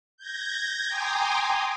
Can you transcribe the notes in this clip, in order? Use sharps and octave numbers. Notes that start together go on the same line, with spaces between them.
G6 G#6 A#6
G5 G#5 A#5 C6 D6 D#6